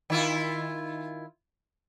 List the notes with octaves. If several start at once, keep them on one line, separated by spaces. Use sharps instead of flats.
D#3 E4 F4